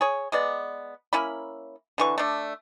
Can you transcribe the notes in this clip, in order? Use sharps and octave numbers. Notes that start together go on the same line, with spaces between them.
G#4 C#5
G#3 B3 D5
A#3 C#4 E4 B5
D3 E3 C#6
A3 D4